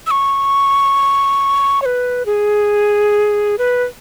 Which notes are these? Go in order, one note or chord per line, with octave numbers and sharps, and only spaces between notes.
E6
C#6
C#5
B4
G#4
B4